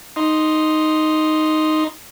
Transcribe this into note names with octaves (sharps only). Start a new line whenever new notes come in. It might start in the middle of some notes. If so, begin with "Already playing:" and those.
D#4 C6